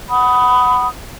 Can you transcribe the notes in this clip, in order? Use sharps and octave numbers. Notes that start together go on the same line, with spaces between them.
F#5 B5 D#6